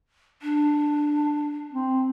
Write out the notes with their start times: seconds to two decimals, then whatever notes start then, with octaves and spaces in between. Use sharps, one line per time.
0.42 D4
1.73 C4